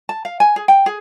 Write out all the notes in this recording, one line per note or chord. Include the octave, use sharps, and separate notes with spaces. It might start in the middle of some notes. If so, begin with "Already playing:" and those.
A5
F5
G#5
G#4
G5
G#4